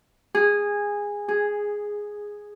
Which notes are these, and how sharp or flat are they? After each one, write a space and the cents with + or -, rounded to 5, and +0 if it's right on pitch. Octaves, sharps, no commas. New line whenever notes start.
G#4 -15
G#4 +0